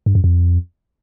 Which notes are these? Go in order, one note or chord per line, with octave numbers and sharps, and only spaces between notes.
G2
F#2
F2